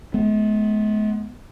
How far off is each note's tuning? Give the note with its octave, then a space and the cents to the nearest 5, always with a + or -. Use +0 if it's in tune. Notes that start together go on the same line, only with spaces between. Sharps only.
G#3 +45 B3 +10